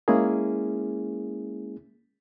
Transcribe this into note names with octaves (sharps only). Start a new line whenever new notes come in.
G#3 A#3 C#4 E4 G#4